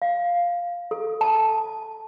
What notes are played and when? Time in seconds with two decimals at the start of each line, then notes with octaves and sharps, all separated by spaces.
0.02 F5
0.91 A4
1.21 A5